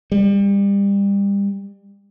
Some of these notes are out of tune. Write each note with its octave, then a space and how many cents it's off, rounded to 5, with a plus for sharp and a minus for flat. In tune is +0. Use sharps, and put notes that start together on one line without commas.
G3 +30